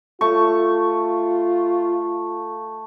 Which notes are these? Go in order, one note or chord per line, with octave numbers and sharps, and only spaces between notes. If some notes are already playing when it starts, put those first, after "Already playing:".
A3 F4 C#6